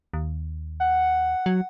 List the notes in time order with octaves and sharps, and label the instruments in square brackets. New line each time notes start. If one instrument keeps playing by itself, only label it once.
[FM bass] D#2
[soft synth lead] F#5
[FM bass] F#3